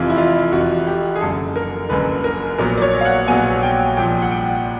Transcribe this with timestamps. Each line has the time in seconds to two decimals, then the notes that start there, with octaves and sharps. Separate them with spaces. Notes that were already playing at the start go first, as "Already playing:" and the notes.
Already playing: F1 F2 C3 E3 F4
0.10 E4
0.17 F4
0.52 F1 F2 C3 E3 F#4
0.87 G4
1.16 G#4
1.21 F#1 F#2 D3 A4
1.56 A#4
1.89 F#1 F#2 D3 B4
2.24 A#4
2.59 A#1 A#2 F#3 B3 A#4
2.77 D5
2.82 C#5
3.01 F5
3.05 F#5
3.28 A#1 A#2 F#3 B3 G#5
3.63 G5
3.97 C2 A#2 F3 G5
4.22 F#5
4.31 G5